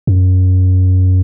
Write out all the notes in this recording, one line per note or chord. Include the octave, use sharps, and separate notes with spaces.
F#2